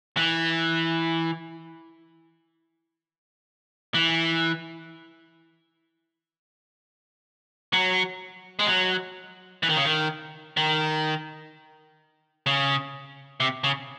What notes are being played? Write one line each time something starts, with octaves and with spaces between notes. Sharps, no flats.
E3
E3
F#3
G#3
F#3
E3
D#3
C#3
D#3
D#3
C#3
C3
C#3